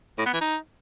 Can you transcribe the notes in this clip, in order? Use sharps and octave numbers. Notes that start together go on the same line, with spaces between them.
A2
B3
E3
D#4